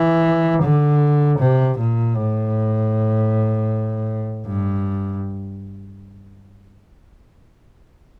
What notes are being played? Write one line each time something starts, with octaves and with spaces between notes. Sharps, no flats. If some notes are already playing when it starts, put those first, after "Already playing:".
Already playing: E3
D3
C3
A#2
A2
G2